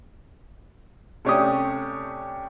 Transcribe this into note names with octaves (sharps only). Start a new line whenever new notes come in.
C3 A3 C#4 D4 G4 D#6